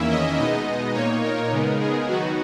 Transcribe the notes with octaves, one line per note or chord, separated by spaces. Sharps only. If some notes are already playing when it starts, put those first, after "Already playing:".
Already playing: E2 D#3 A#3 C#4 E4 E5
D#5
B2 G#3 B3 D#4 D#5
A#2 A#3 D#4 C#5
A#4
C#3 G#3 B3 D#4
G#4
D#3 F#3 B3 D#4 F#4